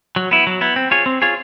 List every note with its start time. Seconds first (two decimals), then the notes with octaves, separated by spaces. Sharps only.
0.16 F#3
0.31 B3 E4
0.47 F#3
0.61 B3 E4
0.76 C4
0.91 F4 G#4 C#5
1.06 C4
1.22 F4 G#4 C#5